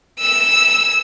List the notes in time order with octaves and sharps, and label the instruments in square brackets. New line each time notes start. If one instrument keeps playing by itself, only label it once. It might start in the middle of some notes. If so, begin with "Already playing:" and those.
[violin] E6 E7